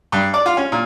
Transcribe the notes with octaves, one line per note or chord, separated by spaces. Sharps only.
G2
D5
F4
C#4
A#2